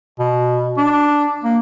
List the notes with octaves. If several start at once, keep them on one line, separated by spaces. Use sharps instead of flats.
B2
D4
A#3